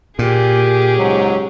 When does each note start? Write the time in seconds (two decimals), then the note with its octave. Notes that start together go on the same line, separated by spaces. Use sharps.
0.19 A#2 G4 G#4
0.98 C#2 G#2 F#3